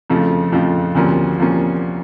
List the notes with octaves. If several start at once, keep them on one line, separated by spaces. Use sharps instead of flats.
F2 C#3 F3 A3
F2 C#3 F3 A3
D2 C3 F3 A#3 C#4
C3 F3 A#3 C#4